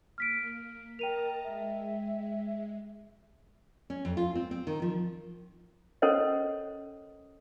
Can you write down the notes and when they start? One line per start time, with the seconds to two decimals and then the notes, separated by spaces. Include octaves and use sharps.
0.18 A#3 F6 B6 D7
0.99 A#4 D#5 G5 A5 A#5 D#7 F7
1.44 G#3 E5
3.90 C#4
4.05 F2
4.17 F4
4.35 C4
4.51 C4
4.67 D#3
4.82 F3
6.02 C#4 A4 A#4 C5 C#5 D#5